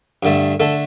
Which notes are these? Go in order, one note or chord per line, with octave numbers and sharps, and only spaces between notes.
G2 D3 A3
D3 A3 A4